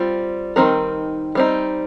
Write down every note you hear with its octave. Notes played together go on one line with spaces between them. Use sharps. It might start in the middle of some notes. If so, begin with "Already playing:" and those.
Already playing: G3 C4 F4
D#3 G3 C4 D#4 A#4
G3 C4 D#4